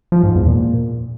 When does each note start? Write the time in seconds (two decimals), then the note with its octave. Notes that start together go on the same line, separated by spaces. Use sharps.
0.12 F3
0.23 G#2
0.35 E2
0.46 A#2